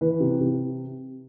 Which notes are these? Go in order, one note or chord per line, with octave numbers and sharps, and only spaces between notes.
E3 B4
C3
C3